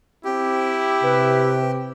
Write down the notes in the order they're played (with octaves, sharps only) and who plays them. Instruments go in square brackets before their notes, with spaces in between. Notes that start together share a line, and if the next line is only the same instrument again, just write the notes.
[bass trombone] C4 [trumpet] E4 [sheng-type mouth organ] G4
[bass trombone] C3 [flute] B4